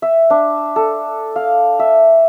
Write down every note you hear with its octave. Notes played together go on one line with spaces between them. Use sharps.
E5
D4
A4
F5
E5